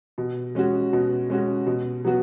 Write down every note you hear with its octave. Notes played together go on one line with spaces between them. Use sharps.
B2
G#3 C#4 F#4
B2
G#3 C#4 F#4
B2
F#3 B3 F#4